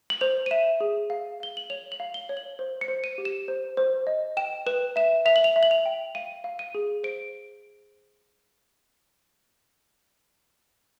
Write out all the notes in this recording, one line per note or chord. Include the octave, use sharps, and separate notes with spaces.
F#7
C5 F7
D#7
E5 E7
G#4
F5
F5 G7
F#7
C#5 F7
F#7
F5
G7
C#5
F#7
C5
C#7
C5
D#7
G4
E7
C5
C5
D#5
G5 E7
B4 E7
E5 E7
E5 F7
F#7
F7
E5
F#7
F7
G5
F5 D#7
F5
D#7
G#4
C5 D7